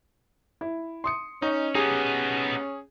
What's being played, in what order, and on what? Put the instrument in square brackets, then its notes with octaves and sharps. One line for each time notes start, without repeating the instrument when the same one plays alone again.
[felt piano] E4
C6 D#6 C#7
[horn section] C#4 [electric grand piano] D#4 [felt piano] D#5
[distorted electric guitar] B3 D#4 [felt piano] G4 [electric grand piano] G#4